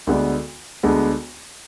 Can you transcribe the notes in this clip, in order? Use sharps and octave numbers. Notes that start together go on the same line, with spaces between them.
D2 D3 G#3 B3 D4
D2 D3 G#3 B3 D4